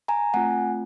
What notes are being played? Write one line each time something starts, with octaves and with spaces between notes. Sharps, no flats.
G#5 A#5
A3 C4 F4 F#5 G#5